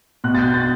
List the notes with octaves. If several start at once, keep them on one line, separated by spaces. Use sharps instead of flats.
B2 F#6
A6
G6
A6